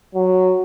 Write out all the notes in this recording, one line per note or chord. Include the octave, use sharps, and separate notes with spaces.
F#3